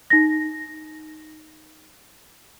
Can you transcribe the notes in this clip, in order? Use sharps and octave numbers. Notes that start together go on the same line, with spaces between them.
D#4 A#6